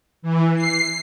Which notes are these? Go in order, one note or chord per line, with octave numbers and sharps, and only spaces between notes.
E3
C7